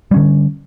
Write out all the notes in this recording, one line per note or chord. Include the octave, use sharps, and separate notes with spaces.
D3 G3 C#4